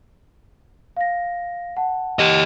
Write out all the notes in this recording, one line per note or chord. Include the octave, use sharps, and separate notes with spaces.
F5 A#6
F#5 A5
G4 D#5